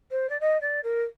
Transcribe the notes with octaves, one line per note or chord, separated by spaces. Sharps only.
C5
D5
D#5
D5
A#4